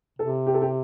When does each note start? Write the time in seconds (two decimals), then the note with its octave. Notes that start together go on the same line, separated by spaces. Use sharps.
0.19 C3 A4
0.47 G4
0.54 A4
0.62 G4